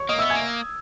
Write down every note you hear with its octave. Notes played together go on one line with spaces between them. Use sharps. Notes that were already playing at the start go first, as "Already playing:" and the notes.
Already playing: C#5 C#6
A#3 D#5 D#6
E5 E6
B3
G#5 G#6
A#3